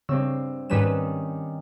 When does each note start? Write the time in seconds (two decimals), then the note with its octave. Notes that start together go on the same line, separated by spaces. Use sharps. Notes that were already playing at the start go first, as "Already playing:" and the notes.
0.09 G2 C#3 C4 E6
0.70 G#2 D#3 G3 C#4 B4 E7